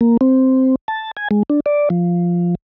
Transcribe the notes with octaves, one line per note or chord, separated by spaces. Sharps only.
A#3
C4
A5
G#5
G#3
D4
D5
F3